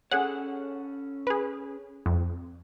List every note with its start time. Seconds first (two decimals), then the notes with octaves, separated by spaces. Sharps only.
0.11 C#4 G#4 A4 C#5 F#5
1.27 G#4 B4
2.06 F2